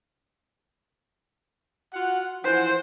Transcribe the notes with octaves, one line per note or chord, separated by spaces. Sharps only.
F4 F#4 F#5
E3 F3 C5 F#5